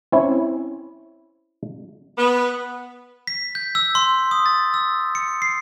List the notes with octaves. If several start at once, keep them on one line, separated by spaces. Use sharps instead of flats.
C4 C#4 E4 C#5
B3
B6
G6
E6
C6
D#6
A6
E6
C#7
C7